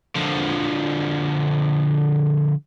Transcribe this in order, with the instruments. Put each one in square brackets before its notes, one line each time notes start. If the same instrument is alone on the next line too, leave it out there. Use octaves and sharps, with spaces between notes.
[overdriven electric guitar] D3 F3